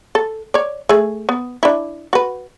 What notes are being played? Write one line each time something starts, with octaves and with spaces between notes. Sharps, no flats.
A4
C#5 D5
A3 G#4
B3
D4 E4
F#4 B4